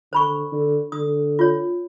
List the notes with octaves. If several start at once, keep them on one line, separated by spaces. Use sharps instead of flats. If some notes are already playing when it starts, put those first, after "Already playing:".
D3 C5 B5 C#6
D3
D3 D#6
F4 C#5